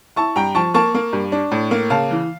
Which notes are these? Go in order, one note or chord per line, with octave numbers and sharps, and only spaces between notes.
E4 A5 C#6
G2 G5 A#5
F3 A5 C#6
A#3 A5 C#6
A#3
G2
D4
A2
A#3
C#3 F5 A5
E3